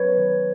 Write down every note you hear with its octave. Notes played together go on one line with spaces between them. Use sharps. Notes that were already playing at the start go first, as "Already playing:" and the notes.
Already playing: F#3 B4 C#5
D#3